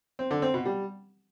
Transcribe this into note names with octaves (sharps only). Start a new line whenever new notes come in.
C4
D3
C4
B2
G3